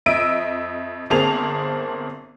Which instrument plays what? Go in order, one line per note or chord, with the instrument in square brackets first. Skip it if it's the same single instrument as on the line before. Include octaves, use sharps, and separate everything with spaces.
[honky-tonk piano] F2 D#5 E5 E6 D7 D#7
G1 A#3 C4 G#4 A5 F7